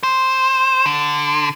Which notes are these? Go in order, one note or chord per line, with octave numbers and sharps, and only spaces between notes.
C5
D3